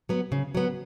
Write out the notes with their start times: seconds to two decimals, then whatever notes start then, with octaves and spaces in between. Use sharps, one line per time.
0.09 F#3 B3
0.32 C#3
0.55 F#3 B3